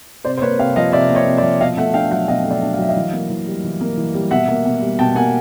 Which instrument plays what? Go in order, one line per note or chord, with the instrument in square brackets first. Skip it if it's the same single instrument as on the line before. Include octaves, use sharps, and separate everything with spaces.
[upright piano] C3 C5 D5
C5
A#3 B4 C#5
C3 F5 G5
F3 D#5 F5
C3 D5 E5
A#3
C#5 D#5
C3
D5 E5
F3
B2 D#5 F5
A3 E5 F#5
D4 F5 G5
F#3 E5 F#5
B2 D#5 F5
A3
D5 E5
D4
F5
F#3 E5
D#5 F5
E3
A#3
E3
G3
E3
A#3
E3
G3
B2 E5 F#5
A#3
B2
G3
B2 G5 A5
A#3 F#5 G#5